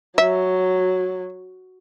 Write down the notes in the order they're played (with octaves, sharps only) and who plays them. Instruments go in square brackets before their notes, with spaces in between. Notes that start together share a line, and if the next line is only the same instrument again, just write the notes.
[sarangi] F#3 [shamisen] E5